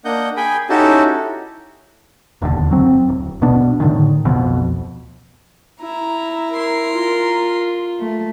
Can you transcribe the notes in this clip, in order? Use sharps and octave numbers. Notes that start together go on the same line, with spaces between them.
A#3 D4 D#5 F#5 G6
G#4 G5 G#5 B5
C#4 D#4 E4 F#4 G4 A4
E1 D#2 A2 D3
F#1 F#3 C4
D1
A#1 B2 B3 D4
A2 D3 D#3
D1 B1 F2 B2
E4 A#5
A#4 C6
F4
A3